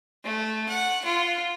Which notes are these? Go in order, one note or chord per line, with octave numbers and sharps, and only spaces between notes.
A3
F#5
F4